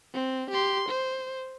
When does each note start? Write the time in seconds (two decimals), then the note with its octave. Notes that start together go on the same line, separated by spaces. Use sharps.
0.14 C4
0.51 G4 C6
0.89 C5